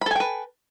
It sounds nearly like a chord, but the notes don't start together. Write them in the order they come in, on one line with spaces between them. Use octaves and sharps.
B5 A4 G#5 G5 B4